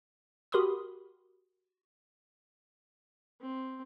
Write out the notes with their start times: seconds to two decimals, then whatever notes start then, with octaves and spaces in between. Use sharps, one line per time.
0.52 F#4 G4 A#4 B5 C6 D#6
3.41 C4